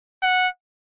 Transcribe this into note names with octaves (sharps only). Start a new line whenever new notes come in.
F#5